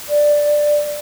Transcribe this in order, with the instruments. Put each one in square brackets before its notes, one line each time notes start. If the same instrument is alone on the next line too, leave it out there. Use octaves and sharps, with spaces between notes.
[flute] D5